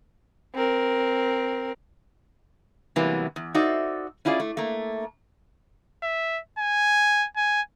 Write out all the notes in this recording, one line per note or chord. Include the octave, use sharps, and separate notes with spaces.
C4 A#4
C3 E3 F#3 G3 A#3 B3
E2
D#4 F#4 A4 C5 D5 E5
C#4 E4 F4 G#4 D5
A3
A3 A#3
E5
G#5
G#5